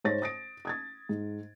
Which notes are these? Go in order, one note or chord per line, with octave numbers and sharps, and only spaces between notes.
G#2 C5 C#5 A6 A#6
D#6 A#6 D7
D#6 G#6 A6
G#2